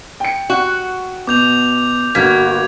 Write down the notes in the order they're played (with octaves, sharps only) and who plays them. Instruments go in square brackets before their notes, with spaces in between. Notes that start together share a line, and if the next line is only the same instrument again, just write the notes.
[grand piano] G5 C#7
[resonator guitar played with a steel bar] F#4
[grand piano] B2 [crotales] D6 G6 F7
[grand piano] G1 G2 B6 [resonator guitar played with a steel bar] A#3 [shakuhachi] F#4 [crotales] G#6